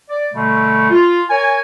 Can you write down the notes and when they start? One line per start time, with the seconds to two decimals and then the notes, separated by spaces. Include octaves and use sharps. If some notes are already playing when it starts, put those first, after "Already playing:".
0.10 D5
0.34 B2 D3 G3 A3
0.91 F4
1.29 A#4 C#5 G#5